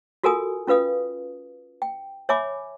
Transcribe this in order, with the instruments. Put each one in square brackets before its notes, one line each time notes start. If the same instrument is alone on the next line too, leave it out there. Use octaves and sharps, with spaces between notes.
[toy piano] F4 F#4 A4 A#4 G#5 D#6
C#4 F4 B4 F5 D#6
G5
C#5 E5 G#5 B5 D6